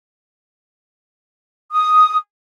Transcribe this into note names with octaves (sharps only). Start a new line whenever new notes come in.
D#6